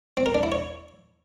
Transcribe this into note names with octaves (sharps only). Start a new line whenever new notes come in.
C4
A#4
D4
E4
C#5